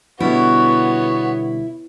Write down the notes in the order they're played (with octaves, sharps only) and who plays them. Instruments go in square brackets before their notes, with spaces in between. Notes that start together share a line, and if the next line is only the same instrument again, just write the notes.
[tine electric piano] B2 D3 G3 [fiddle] B3 C#5 [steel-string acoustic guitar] E4 [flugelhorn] F#4